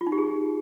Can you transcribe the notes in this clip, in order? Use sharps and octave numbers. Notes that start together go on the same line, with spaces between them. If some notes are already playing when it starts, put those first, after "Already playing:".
F4
D#4
G4
G#4